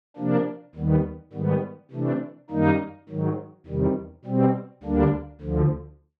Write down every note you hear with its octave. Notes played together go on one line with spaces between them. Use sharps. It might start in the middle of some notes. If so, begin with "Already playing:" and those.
C3 F3 A#3 D4
D#2 D#3 G3 B3
G#2 D#3 G3 B3
C3 E3 A3 D4
F#2 D#3 G3 A#3 D#4
G#2 D#3 F#3
E2 C3 D#3 G3
B2 G3 C4
D2 D3 G3 A#3 D4
D2 D3 F3